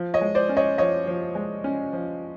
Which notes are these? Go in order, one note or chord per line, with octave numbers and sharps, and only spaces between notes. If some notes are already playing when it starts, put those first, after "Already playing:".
Already playing: F3
C#5 D#5
G#3
C5 D5
C#4
C#5 D#5
F3 C#5 D#5
F3
G#3
C#4
F3